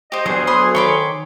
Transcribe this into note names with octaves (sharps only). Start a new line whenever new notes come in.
G4 C5 D#5
D2 F#3 B3 G#4 C5 C6
B5 C6 D#6
D#3 C#5 G#5 B5 C6 D6